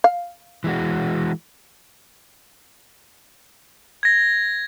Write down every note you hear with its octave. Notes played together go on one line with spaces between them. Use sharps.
F5
E3 G#3 F#4
G#6 A#6